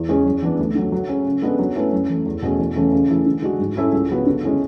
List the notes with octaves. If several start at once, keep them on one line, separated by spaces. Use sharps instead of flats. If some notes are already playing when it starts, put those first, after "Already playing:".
Already playing: E2
C#3 G#3 C#4 G#4
F#2
E3 B3 D4
D2
D3 F#3
F#3
C#4 G#4
C#3
G#3 B3 D4 A4
F#3
A3 C#4 E4 B4
F#2
E3 A3
E2
B2 A3 C#4 G#4
E2
C#3 E3 A3 C#4
C#3
E3 A3 E4 G#4
D3
G#3 D4 F#4
G#2
G#3 C#4 E4 A4
C#2
C#3 F#3 B3 F#4
D3
G#3 C#4 E4